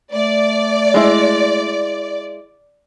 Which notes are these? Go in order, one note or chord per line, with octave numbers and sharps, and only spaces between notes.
A3 D5
G#3 E4